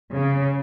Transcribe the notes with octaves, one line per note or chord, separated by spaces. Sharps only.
C#3